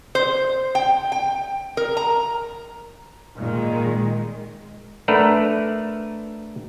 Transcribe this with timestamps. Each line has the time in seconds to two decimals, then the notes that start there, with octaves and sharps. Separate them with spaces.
0.15 C5
0.75 G5
1.12 G5
1.77 A#4
1.97 A#5
3.38 A#2 D#3 G#3
5.08 A3 D4 A#4 B4 F#5